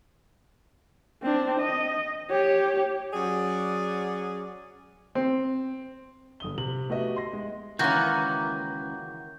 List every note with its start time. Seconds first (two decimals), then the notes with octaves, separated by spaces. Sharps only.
1.22 C4 D4
1.60 D#5
2.31 G4 C#5
3.14 F#3 C#4 G#4 D5 F#5
5.15 C4
6.40 G1 D#6 G7
6.58 C3 F#7
6.90 A3 B3 F#4 G4 D#5 E5
7.16 C6 A#6
7.33 G#3
7.79 C#2 D#3 E3 A#3 C#4 F#4 G6